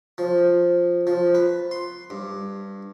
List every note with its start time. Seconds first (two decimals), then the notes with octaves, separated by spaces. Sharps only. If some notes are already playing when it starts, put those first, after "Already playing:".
0.18 F3
1.07 F3
1.35 B4
1.71 C6
2.10 G2